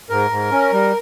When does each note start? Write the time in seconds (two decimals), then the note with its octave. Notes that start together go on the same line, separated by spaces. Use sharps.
0.10 G#2 A#4
0.30 G#2
0.52 C#4
0.73 G3